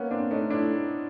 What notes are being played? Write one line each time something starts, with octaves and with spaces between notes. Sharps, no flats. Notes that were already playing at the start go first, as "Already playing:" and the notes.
Already playing: A#3 B3 C#4
C4 D4
A3 C#4 D#4
D4 E4